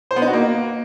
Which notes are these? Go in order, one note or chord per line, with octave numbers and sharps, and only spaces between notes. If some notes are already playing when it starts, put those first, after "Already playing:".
C5
B3
D#4
F#4
A#3